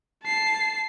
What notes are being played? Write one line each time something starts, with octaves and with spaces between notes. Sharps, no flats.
A5 C7